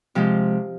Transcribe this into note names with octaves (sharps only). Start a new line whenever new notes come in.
C3 F3 G#3